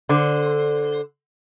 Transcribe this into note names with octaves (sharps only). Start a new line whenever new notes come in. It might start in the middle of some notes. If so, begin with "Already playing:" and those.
D3 C5